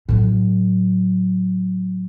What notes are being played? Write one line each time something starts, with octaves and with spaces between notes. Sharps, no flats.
A2 F#3